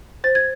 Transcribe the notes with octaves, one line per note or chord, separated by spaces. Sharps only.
C5 A6
G#6